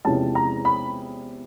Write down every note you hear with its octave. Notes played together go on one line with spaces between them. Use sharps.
E2 C3 F3 G#3 C#4 A5
A#5
B5